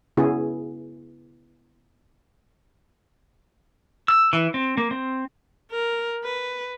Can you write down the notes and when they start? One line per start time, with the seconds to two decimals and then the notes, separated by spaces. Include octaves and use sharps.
0.17 C#3 B3 E4 F#4 G#4
4.08 E6
4.33 E3
4.54 C4
4.77 A#3
4.91 C4
5.71 A#4
6.24 B4